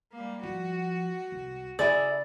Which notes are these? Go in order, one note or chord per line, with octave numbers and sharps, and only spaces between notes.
G3 A#3
F3 F#4
C2
C#3 E4 G#4 A4 D5